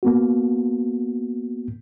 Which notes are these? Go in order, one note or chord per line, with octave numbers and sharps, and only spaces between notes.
A#3 B3 F#4